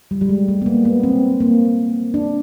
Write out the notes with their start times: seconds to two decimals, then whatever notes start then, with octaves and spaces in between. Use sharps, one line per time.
0.11 G3
0.21 G3
0.29 G#3
0.48 A3
0.62 B3
0.66 A#3
0.85 B3
1.03 C4
1.40 A#3
2.14 D4